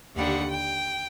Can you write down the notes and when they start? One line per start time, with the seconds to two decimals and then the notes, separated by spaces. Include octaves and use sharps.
0.15 D#2 D3 G3 F#5
0.50 G5